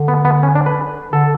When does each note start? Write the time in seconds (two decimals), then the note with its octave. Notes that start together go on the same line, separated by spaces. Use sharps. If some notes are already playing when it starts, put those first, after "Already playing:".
Already playing: D3
0.08 B3
0.25 B3
0.43 C#4
0.55 D4
0.66 B4
1.13 D3 A4